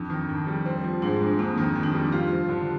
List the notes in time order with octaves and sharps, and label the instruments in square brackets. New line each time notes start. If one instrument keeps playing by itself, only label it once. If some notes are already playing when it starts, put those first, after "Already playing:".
Already playing: [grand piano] F2 [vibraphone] D4
[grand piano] D#3
F2
G3
C4
F3
[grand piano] G#2 [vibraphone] D4
[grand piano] G#3
[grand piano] F2 [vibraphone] A#3
[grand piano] D#3
[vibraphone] A#3
[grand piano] F2
[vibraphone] D4
D#4
[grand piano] G3
[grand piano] F4 [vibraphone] G4
[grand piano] F3
D3